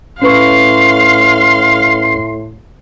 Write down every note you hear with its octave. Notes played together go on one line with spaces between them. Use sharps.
A2 C#4 B4 F5 C6 C#6